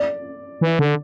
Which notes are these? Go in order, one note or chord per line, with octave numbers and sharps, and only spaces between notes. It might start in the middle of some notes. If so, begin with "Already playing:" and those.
Already playing: D5
E3
D3